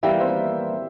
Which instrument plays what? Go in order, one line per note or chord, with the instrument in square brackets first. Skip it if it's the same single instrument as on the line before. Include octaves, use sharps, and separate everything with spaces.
[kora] E3 G3 A#3 [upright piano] E5 G5
[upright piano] C5 E5